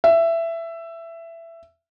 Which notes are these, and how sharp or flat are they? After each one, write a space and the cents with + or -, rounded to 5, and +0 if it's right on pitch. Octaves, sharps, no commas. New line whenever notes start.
E5 +15